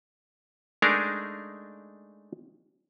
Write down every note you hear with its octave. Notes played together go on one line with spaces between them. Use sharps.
G#3 A3 D4 D#4 G#4 A#4